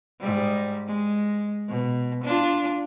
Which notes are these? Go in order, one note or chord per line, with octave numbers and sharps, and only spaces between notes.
G#2 G3
G#3
B2
D4 F4